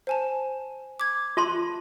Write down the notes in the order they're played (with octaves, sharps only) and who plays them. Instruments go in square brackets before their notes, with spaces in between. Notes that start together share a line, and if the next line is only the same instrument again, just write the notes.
[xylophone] C5 G#5 A5
D6 G#6
[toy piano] F4 A5 C6